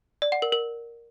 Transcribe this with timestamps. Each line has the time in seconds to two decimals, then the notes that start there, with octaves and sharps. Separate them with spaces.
0.22 D5
0.32 F#5
0.42 A#4
0.52 A#4